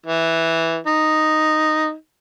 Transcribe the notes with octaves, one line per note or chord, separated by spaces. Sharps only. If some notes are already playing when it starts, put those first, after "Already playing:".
E3
D#4